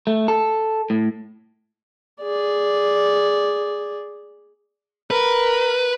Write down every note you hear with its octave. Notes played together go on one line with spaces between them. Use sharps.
A3
A4
A2
G#4 D5
A#4 B4